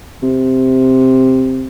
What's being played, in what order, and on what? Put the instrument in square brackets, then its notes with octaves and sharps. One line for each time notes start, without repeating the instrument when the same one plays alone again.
[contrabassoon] C3